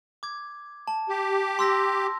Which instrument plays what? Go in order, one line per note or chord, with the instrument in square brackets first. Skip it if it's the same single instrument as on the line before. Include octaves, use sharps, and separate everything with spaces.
[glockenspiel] D6 G#6
A5
[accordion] G4
[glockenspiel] C6 E6 A#6